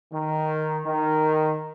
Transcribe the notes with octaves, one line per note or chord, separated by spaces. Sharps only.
D#3
D#3